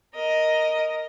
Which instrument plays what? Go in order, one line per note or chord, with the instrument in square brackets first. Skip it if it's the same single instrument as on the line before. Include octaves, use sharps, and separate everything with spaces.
[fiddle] A#4 D#5